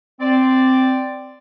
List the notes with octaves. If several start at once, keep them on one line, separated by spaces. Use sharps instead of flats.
C4 D5